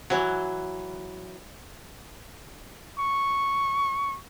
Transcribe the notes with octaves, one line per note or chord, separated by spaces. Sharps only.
E3 F#3
C#6